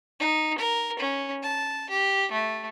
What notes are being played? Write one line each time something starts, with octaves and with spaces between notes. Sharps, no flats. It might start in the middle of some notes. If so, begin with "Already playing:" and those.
D#4
A#4
C#4
A5
G4
A3